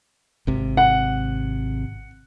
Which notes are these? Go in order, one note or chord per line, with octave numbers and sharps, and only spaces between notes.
G#1 C3
F#5